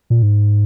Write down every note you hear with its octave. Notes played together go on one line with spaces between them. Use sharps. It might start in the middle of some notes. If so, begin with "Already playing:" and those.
A#2
G#2